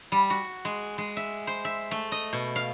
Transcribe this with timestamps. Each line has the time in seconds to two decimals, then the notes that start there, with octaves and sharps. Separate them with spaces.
0.12 G3
0.30 F#4
0.65 G#3
0.98 G#3
1.17 E5
1.47 C5
1.65 E5
1.91 A3
2.12 D#5
2.33 B2
2.56 F5